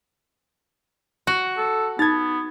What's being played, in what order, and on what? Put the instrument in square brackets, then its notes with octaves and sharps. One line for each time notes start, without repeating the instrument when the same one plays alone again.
[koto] F#4
[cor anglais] A4
[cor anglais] B3 [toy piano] D#4 [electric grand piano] G#6 A6